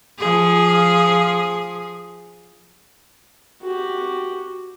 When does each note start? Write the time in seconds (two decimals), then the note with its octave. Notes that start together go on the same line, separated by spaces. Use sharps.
0.19 F3 G#4
3.62 F#4 G4